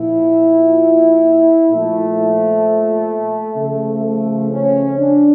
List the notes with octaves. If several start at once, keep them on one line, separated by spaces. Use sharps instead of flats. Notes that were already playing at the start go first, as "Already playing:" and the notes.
Already playing: A#2 F3 E4
A#2 F3 A3
C#3 F3 A3
A3
C#4
D4